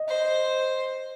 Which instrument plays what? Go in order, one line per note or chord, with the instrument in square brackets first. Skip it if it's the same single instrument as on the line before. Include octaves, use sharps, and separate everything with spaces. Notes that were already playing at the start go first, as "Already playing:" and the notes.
Already playing: [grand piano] D#5
[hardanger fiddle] C5